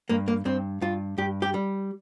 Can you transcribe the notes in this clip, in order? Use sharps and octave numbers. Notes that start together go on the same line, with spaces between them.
G2 A#3
A#3
G2 C4
G2 F4
G2 G4
G4
G3